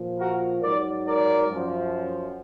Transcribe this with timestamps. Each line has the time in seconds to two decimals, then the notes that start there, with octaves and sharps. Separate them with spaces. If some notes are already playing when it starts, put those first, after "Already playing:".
Already playing: A#2 F3
0.18 F#4 A#4
0.61 G#2 F#3 A#4 D5
1.05 A#4 D5
1.49 F#2 F3